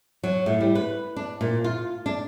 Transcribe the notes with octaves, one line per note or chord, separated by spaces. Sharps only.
F#3
A2
G3
B4
D4
A#2
F4
D4